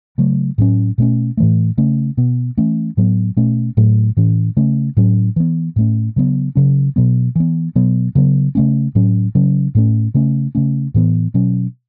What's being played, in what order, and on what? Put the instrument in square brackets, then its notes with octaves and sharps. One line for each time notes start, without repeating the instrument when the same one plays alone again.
[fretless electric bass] C#3 F#3 A3
A2 F#3 C#4
B2 A3 C#4
A2 E3 A3
C#3 A3 C#4
B2 B3
E3 A3 C#4
A2 F#3 B3
B2 A3 C#4
A2 F#3 A3
A2 E3 C#4
C#3 A3 C#4
A2 F#3 C#4
E3 B3
A2 A3 C#4
C#3 F#3 B3
C#3 F#3 C#4
B2 F#3 B3
E3 B3
B2 F#3 B3
C#3 F#3 B3
C#3 A3 C#4
A2 F#3 C#4
C#3 F#3 C#4
A2 A3 C#4
C#3 A3 C#4
C#3 A3 C#4
A2 E3 B3
B2 F#3 C#4